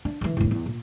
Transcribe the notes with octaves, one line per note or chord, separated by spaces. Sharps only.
D4
D3 E3
E1 A2
E2
A#2